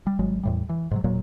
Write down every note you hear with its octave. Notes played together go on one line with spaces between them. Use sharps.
G3
G#1 F#3 G#3
E2 A2 G3
E3
G#2 C3 F#3
E1 A#2 F#3 A#3